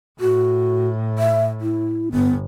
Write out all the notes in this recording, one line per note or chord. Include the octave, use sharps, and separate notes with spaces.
A2 F#4
E5
E4
G1 B3